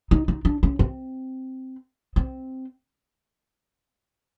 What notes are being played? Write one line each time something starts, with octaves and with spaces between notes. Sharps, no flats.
D#4
D#4
D4
C#4
C4
C4